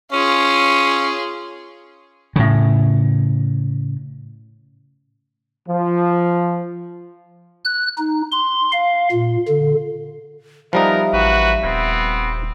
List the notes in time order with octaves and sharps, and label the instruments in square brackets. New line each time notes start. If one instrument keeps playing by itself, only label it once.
[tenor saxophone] C#4 [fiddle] F4 G#4
[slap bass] A2 C#3
[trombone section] F3
[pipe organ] F#6
D#4
C6
F5
A#2
D3
[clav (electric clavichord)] F3 G3 D#4 [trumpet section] B3 A#4 [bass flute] E5
[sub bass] A1 [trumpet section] F#4 B4
[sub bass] D#1 [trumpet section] B3 C4